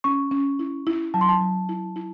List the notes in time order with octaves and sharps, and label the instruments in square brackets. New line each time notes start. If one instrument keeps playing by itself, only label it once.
[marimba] C#4 [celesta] C#6
[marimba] C#4
E4
E4
[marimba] F#3 [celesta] A5
[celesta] C6
A5
[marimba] F#3
E4
E4